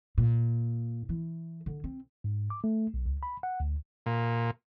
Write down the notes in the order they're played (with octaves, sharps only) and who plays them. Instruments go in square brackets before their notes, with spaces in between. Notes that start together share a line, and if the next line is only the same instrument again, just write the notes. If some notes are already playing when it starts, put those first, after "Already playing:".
[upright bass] A#2
E3
D3
C4
[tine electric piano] G#2
D6
A3
B1
C#2
B5
F#5
D2
[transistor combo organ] A#2